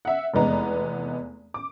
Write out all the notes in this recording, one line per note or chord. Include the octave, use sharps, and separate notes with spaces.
E5 F#5
F1 E2 G#3 B3 A#5
D6